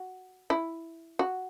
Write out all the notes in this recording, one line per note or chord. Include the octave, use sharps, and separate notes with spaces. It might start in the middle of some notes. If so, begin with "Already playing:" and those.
Already playing: F#4
E4
F#4